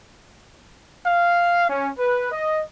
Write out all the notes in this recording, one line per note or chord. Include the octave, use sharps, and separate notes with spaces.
F5
C#4
B4
D#5